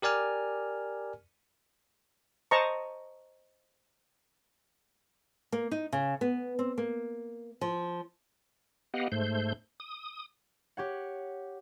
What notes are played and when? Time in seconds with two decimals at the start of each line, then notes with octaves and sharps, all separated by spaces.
0.02 G4 A#4 D5 G#5 F6
2.51 C5 D#5 A5 A#5 C#6
5.52 A#3
5.71 D#4
5.92 C#3
6.21 B3
6.59 C4
6.78 A#3
7.61 F3
8.94 B3 G4 D#5 F5 F#5
9.12 G#2 A3 C5 G6
9.80 D#6
10.77 G4 C#5 F#5